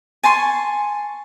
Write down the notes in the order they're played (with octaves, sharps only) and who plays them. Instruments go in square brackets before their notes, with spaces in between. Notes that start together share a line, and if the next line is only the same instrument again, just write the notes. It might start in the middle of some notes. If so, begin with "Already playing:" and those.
[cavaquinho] G#5 A5 C6 C#6